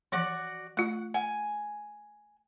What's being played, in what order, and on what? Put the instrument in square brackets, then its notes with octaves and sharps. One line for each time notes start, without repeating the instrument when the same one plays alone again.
[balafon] E3 F3 [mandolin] F#4 D5 F#5
[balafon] A3 F4 [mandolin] F#5
[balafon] F#5 [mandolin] G#5